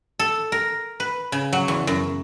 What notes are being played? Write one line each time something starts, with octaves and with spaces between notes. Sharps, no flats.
A4
A#4
B4
C#3
F#3
E2
F#2